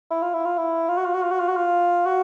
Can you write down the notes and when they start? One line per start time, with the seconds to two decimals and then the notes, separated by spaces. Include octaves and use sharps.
0.11 E4
0.22 F4
0.34 E4
0.45 F4
0.58 E4
0.89 F4
0.98 F#4
1.06 F4
1.14 F#4
1.23 F4
1.31 F#4
1.40 F4
1.49 F#4
1.57 F4
2.06 F#4